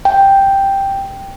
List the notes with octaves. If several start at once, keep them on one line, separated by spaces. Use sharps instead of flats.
G5